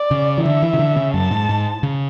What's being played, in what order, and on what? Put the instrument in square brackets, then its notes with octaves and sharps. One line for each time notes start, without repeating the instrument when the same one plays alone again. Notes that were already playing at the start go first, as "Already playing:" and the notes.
Already playing: [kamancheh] D5
[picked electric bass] C#3
E3
[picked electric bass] D3 [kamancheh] E5
[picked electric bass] E3
C#3
D3
C#3
[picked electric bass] F#2 [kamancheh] A5
[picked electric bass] G#2
G#2
C#3